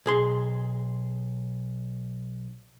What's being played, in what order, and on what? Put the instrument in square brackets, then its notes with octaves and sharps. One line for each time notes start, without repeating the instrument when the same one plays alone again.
[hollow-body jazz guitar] B1 G#4 C6